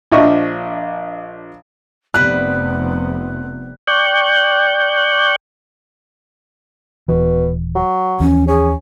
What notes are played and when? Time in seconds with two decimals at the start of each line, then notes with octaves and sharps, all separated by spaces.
0.12 A#1 F3 D4 D#5 E5 C#6
2.14 F1 C3 G3 B3 B4 F#6
3.87 D5 G5 C#6 F#6 G6
7.08 D#1 B2 E3
7.75 F#3
8.20 D#2 E3 F3 C#4
8.48 C#4 G#4